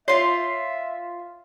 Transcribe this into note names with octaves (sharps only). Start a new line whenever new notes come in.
F4 C#5 E5 C6